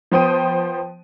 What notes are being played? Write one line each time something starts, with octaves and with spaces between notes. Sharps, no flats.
F3 B3 C5 G5 D#6 D#7